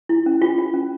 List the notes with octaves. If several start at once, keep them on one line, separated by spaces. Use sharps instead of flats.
E4
C#4
F4
F4
C#4